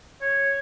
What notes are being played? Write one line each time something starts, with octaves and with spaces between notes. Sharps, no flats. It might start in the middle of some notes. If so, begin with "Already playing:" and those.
C#5